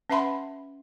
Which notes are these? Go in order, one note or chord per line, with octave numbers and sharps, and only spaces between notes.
C#4 B4 E5 F#5 B5 C6